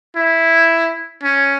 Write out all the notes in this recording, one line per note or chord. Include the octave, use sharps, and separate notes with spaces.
E4
C#4